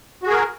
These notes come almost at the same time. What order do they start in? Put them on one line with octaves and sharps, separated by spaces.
F#4 G#4 A#4